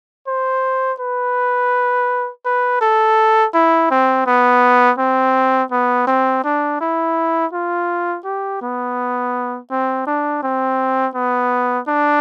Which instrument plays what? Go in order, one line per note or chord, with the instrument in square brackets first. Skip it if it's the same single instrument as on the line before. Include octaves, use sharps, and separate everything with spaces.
[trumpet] C5
B4
B4
A4
E4
C4
B3
C4
B3
C4
D4
E4
F4
G4
B3
C4
D4
C4
B3
D4